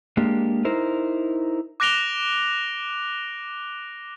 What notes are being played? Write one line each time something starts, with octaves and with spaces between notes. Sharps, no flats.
G#3 A#3 D4 G4
D#4 E4 A#4 C5
D6 F#6 A#6 D7 F7 G7